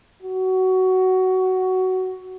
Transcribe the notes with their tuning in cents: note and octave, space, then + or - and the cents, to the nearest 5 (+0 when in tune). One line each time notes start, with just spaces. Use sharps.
F#4 +15